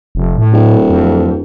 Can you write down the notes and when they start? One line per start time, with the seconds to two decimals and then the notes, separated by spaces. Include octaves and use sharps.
0.15 F1
0.38 A2
0.53 D1
0.90 F2